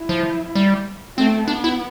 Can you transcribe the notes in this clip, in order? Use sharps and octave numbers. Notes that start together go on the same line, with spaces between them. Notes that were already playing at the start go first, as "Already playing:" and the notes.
Already playing: E4
F3
G3
A3 C4
B3 D4
E4